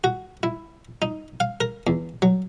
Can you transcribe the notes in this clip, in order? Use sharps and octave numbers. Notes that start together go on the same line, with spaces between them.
F#4
E4
D#4
F5
A#4
E2
F#3